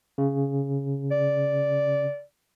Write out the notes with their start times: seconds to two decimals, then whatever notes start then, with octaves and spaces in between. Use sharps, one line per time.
0.18 C#3
1.12 D5